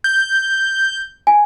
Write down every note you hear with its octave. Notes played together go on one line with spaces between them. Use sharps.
G6
G#5